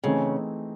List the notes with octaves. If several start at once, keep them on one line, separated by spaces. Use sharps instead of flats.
C#3 E3 A3 C4 D#4 G#4